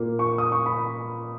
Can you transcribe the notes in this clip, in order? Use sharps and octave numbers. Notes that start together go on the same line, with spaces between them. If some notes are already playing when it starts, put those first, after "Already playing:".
Already playing: A#2 A#3
C#6
D#6
C#6
B5